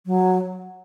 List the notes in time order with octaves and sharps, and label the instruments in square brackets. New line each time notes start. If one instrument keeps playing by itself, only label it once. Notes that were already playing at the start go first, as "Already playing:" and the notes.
[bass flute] F#3